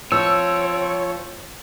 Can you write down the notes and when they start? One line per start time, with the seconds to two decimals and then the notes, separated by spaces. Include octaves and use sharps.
0.12 F3 C4 C#5 E6